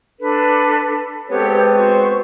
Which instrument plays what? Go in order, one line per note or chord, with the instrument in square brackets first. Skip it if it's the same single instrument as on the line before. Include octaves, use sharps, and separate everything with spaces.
[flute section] D4 A4 B4
[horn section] G#3 B3 C4 [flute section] G4 A4 C#5
[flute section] F#4 C5 C#6